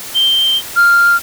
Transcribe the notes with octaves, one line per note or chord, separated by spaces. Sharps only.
G7
F6